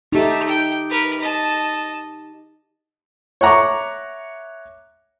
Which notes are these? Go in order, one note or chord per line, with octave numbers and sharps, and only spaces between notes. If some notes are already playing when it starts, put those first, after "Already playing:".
A3 D#4 G4
G5
A#4 B4
D#5 A5
C#5 E5 F#5 A#5 C#6 D6